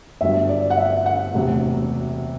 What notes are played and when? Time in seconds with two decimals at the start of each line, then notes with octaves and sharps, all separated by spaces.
0.21 G1 G2 F#3 E5
0.49 D5
0.70 F#5
0.77 E5
1.06 F#5
1.34 E1 D2 C3 F#3